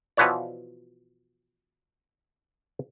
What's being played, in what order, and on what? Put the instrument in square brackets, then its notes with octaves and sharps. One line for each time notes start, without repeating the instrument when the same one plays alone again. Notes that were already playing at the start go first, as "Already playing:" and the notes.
[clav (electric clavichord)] B2 E3 F3 B4 C#5 D5